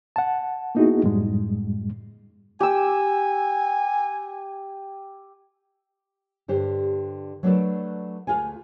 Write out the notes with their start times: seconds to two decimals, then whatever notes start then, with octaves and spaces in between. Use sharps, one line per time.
0.16 F#5 A5
0.75 A#3 B3 D#4 E4 F#4 G#4
1.03 F#2 A2 G3 G#3
2.60 G4 G#5 E6
6.48 G2 D3 G4 C5
7.43 F#3 A3 D4 G#4 A4 B4
8.27 D2 A#2 F4 G#4 G#5